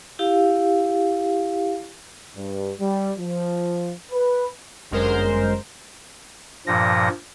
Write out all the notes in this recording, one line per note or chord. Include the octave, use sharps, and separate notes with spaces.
E4 G4 F5
G2
G3
F3
B4
G1 F#2 G#3 A#4 C5
G2 A#2 F3 A#6